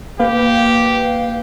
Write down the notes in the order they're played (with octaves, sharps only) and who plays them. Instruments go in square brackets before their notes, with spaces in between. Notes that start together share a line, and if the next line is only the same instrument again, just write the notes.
[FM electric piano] A#3 B4 F5 [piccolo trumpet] G4